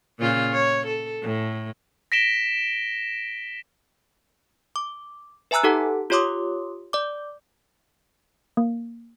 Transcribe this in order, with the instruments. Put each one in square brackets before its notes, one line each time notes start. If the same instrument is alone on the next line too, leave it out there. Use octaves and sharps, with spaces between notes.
[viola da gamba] A#2 C#3 F4
C#5
A4
A2
[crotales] A#6 B6 D7 E7 G7
[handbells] D6
B4 E5 G#5 A#5 E6 F#6
D#4 G4 A4 F#5 A5
F4 G4 C#5 C6 D6 D#6
D5 D6
A#3